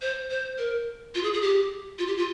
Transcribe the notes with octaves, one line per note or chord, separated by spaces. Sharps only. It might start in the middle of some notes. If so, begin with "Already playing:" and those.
C5
C5
A#4
F4
G#4
G#4
G4
F4
G4
F4